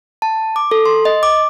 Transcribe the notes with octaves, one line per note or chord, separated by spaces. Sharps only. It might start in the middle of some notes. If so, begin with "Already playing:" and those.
A5
D6
A4
C6
D#5
D6